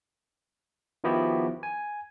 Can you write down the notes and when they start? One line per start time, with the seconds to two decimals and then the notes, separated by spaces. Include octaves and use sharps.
1.04 D#3 F3 B3 E4 F#4 G4
1.63 G#5